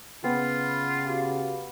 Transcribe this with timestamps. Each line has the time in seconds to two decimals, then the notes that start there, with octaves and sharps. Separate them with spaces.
0.24 C#3 B3 F4 G5 B5
1.05 F#4 G4 F5